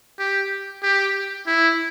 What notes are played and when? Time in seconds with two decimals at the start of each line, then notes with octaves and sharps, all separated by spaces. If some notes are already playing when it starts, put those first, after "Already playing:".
0.19 G4
0.83 G4
1.47 E4